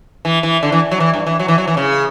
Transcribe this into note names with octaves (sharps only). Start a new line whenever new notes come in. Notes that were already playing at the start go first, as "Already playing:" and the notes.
E3
E3
D3
E3
F#3
E3
G2
E3
F#3
E3
F#3
E3
C#3